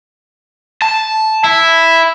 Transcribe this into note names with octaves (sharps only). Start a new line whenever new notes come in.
A5
E4